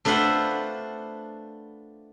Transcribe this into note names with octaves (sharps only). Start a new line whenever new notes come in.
A3 D4 F4 B4 C5 F#5